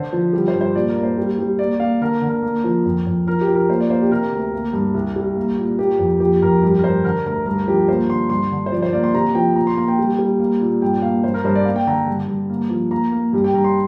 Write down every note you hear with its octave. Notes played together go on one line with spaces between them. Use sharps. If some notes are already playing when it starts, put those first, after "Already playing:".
Already playing: D3 C5
F3
G3 G4
C5
G2
C5
A#2 D5
A#4
A#3
C5
G3
G3
A#3 D5
A#3 F5
D3 A#4
D3
A#4
A#3
F3
F2
F2
F3 A#4
G4
F3
A#4
A#3 C5
D5
A#3 C5
G4
C3 A#4
D2
A#3
G2
C2
G3
A#3
A#2
A#3 G4
F2
F3 G4
F2 A#4
G2 G4
A#4
G2 C5
D3 A#4
D2 A#4
G2 A#4
F3 G4
A#3 C5
D3 C6
G2 C6
D3
C5
F3 D5
C5
A#3 D5
C6
C3 A#5
F3 G5
A#2 A#5
C6
A#3 A#5
G5
G3
G3
A#3
A#2
G2 G5
A#3 F5
G2 C5
A#4
G2 C5
D5
A#3 F5
G5
D3 A#5
G2
G2
A#3
F3
A#3 A#5
A#3
G2 G4
G5
G2 A#5
C6